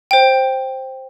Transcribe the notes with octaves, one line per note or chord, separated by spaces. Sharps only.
C5 G5